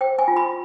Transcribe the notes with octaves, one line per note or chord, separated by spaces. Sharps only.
C5 G5
G#5
F4
B5